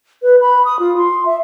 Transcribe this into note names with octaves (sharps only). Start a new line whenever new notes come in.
B4
B5
D#6
F4
C6
E5